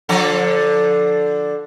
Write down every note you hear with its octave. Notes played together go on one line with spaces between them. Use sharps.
D3 F3 A4